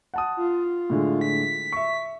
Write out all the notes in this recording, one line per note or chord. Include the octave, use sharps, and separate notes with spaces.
F#5 A5 D#6
F4
A2 D3 G#3
B6
E5 C#6